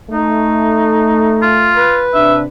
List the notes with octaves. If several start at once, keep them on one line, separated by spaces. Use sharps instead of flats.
A3 D#4
F4
B4
C3 D4 E5